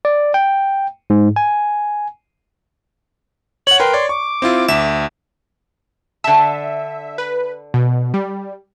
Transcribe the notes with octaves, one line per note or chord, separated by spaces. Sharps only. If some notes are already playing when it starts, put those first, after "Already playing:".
D5
G5
G#2
G#5
C#5 F#5 F#7
A#4 B4 G5 C6
C#5 D5
C#6 D6
C4 E4 F4
D2 E5 E7
D3 E5 A5
B4
B2
G3